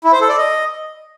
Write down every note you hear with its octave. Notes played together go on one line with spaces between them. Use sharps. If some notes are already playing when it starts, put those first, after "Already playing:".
E4
C5
A4
D5
D#5